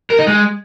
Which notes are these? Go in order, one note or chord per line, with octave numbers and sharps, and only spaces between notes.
A#4
D#4
G#3